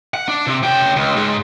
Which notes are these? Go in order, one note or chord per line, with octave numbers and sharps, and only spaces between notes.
F#5
D4
C3
C#3 G5
C#2
G#2